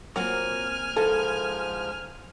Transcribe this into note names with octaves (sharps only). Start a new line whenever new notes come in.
F#3 A#3 C4 F4 G#5 F6
G#2 F3 E4 A4 A#4